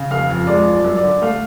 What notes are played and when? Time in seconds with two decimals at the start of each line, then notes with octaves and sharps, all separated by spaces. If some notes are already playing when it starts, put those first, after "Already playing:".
Already playing: C#3
0.10 F1 F5
0.29 F2
0.47 G#3 D5
0.67 F3
0.72 D5
0.84 F#2
0.97 D5
1.03 D3
1.22 A3 F5